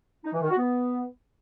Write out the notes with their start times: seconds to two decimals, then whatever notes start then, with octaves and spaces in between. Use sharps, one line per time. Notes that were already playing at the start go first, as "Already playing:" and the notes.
0.24 D#4
0.33 E3
0.41 D#3
0.49 F#4
0.58 B3